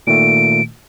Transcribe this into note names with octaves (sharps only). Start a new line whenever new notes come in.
A#2 D#3 A3 D7